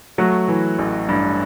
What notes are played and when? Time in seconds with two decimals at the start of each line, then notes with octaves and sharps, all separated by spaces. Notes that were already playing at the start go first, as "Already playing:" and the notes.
0.18 F#3 A3 F#4
0.48 E3
0.79 A1
1.09 G2